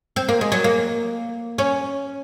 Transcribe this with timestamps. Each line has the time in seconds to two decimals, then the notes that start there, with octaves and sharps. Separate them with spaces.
0.16 C4
0.29 A#3
0.41 G#3
0.52 F#3
0.64 A#3
1.58 C#4